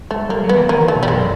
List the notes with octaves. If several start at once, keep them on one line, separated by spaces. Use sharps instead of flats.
G#3 A3
G3 A#3
F#3
B3
E3
D#3 A#3
E3
A3
B2
G3
F#2 G#3